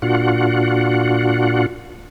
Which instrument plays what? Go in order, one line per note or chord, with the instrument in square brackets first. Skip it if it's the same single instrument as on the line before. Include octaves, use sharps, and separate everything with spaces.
[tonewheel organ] A#2 D4 F4 F#4 F#5